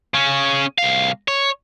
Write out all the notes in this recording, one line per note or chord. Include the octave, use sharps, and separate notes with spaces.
C#3 C#4
C2 F5
C#5